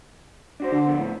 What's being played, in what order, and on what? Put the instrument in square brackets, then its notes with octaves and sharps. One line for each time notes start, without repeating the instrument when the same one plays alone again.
[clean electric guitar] D4 F#4 C5
[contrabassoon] D3
[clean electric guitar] F3 B3 C4
[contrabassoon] A2